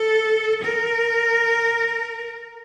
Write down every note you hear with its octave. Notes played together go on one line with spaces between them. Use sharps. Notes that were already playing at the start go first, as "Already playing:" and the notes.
Already playing: A4
A#4